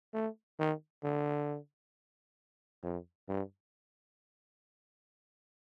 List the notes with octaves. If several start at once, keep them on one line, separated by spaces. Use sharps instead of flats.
A3
D#3
D3
F2
G2